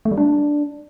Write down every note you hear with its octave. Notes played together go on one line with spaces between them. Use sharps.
A3
G3
D4